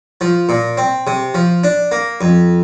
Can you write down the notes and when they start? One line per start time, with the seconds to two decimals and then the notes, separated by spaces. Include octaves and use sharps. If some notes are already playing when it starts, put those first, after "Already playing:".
0.21 F3
0.49 A#2
0.77 C4
1.07 C3
1.34 F3
1.64 D4
1.92 A#3
2.21 F2